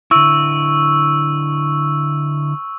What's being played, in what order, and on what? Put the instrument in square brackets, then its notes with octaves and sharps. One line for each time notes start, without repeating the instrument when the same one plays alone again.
[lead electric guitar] D3 E4 [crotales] C#6 E6